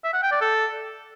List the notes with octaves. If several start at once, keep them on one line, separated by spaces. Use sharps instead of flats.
E5
F#5
G5
D5
A4